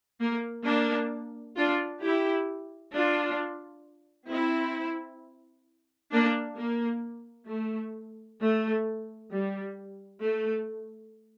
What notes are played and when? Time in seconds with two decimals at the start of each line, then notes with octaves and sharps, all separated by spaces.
0.20 A#3
0.65 A#3 D4
1.56 D4 F4
2.02 E4 G4
2.93 D4 F4
4.30 C4 E4
6.12 A#3 D4
6.57 A#3
7.49 A3
8.40 A3
9.31 G3
10.21 A3